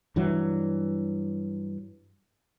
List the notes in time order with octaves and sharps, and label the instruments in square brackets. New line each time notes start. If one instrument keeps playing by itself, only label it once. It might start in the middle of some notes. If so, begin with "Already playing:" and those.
[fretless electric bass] G2 E3 F#3